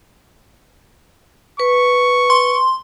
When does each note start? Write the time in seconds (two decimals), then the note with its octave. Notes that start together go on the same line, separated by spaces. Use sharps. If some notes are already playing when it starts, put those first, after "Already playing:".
1.60 B4 C#6
2.30 C6